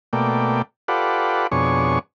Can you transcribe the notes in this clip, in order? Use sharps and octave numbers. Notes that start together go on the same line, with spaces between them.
B2 A3 A#3 D5 G5
F4 G4 A4 B4 D5 F#5
F2 B2 D4 G#4 C#5 C#6